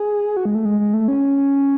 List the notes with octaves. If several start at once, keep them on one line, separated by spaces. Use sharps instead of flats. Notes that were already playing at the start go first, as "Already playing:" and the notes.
Already playing: G#4
F#4
G#3
A3
G#3
G#3
A3
C#4